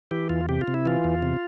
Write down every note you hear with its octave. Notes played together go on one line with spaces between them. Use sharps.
E3 G4
E2 F4
C3 G4
F4
C3
E4
E3 F4
E2
C3